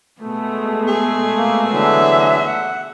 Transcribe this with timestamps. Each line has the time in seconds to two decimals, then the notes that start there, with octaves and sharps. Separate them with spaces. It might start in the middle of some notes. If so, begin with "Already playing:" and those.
0.22 B2 G#3 A3 B3
0.88 G#4
1.37 A#3
1.70 D3 E3 F#3 E5
2.46 F#5